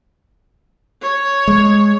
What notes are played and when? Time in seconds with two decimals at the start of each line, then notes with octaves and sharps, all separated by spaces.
1.02 C#5
1.48 G#3